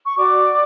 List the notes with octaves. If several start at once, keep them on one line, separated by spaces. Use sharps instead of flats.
C#6
F#4 D5 D6